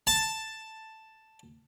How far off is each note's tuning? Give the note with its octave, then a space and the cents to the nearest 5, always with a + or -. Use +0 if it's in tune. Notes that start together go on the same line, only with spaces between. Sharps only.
A5 +5